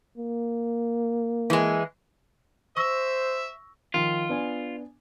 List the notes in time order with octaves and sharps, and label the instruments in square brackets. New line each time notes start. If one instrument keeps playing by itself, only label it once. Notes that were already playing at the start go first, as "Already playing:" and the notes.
[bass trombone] A#3
[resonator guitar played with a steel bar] E3 G#3
[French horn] C5 [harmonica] E5 [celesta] C#6 E6 A#6
[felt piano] D#3 F3 [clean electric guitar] F4
[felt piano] B3 D4 G#5